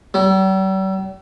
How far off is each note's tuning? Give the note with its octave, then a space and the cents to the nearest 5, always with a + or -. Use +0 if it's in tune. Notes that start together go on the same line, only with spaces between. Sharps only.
G3 -45